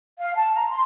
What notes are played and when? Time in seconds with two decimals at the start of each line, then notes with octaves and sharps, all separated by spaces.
0.20 F5
0.36 A5
0.54 A#5
0.70 C6